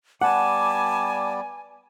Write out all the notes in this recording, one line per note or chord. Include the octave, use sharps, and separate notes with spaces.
G3 B3 D5 F#5 G#5 A5 D6